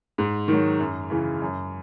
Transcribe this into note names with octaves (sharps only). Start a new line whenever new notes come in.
G#2
D#3 F#3
F#2
C#3 E3
F#2